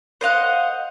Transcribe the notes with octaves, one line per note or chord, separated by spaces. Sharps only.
C5 D#5 F5 F#5